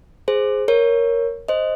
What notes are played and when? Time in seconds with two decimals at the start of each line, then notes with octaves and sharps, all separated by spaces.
0.28 G#4 C5
0.68 A#4 C#5
1.48 C5 D#5